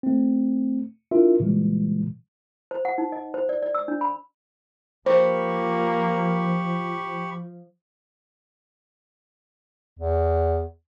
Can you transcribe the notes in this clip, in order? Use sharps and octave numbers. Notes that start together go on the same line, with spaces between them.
A3 C4
D4 E4 F4 A#4 E5
A#2 C#3 E3 G3 G#3
C5
F#5
D#4
D#5
C5
D5
D5
E6
D4
B5
F3 A#3 G4 C5 B5 C#6
E2